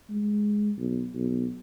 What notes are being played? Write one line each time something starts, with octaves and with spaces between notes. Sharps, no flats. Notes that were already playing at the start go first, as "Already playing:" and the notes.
G#3
B1
B1